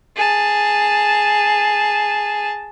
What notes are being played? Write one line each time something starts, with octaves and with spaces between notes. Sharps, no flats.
G#4 A5